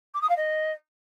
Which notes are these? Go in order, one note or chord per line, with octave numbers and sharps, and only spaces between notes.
D6
D#6
F5
D#5